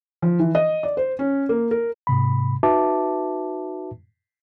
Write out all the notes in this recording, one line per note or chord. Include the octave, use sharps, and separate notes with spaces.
F3
E3
D#5
D5
C5
C#4
A#3
A#4
G#2 C3 B5
D#4 F#4 B4 E5 A5 D6